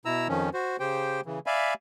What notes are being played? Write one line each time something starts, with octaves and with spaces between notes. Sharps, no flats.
B2 E4 A#5 E6
F2 D#3 F3 C#4
F#4 C5
C#3 G4 C5 G5
C#3 E3
D5 E5 F5 G#5 B5